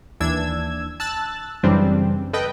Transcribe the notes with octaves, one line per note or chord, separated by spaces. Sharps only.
D#2 E3 D4 E6 G#6
A5 E6 F#6 A6
F#2 C#3 E3 G3 C4 D4
A4 B4 D#5 G5